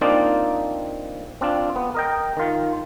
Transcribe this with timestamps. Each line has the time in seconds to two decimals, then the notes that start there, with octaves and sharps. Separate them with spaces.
0.01 A#3 C4 D4 D#4 F4 D5
1.41 C4 D4 F4
1.76 B3
1.95 A#4 D#5 G5
2.37 D#3 F4